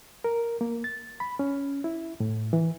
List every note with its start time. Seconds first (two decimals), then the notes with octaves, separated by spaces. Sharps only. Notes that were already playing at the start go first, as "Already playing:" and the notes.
0.24 A#4
0.61 A#3
0.84 A6
1.20 B5
1.39 C#4
1.84 E4
2.20 A2
2.53 E3